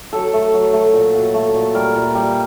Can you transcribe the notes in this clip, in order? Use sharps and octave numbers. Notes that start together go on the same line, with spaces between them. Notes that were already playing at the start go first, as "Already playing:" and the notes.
F#3 A4
A3
F#3
A3
A#2
F#3
A3
A#2
G3 A#4
A#2
G3